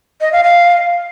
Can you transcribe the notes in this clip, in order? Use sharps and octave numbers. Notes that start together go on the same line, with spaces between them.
D#5
F5
F5